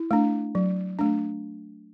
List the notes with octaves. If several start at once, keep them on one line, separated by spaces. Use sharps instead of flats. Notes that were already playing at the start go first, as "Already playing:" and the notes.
Already playing: E4
A3 D4
F#3
A3 D4